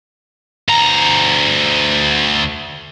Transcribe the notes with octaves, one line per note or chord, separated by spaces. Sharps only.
D2 A#5